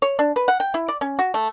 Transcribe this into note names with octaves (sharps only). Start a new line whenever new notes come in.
C#5
D4
B4
F#5
G5
E4
D5
C#4
F#4
A3